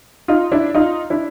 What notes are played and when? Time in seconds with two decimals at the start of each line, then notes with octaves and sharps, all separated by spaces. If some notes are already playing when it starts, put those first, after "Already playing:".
0.28 D#4 F4
0.52 D4 E4
0.75 D#4 F4
1.10 D4 E4